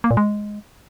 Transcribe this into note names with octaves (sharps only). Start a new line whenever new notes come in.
A#3
A#2
G#3